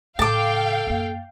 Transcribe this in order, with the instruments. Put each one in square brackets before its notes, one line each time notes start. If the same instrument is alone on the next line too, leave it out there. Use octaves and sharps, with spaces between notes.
[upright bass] A2 C#3 [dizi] A4 [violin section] F5 G5 [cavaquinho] A5 D6
[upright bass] F#2 A#3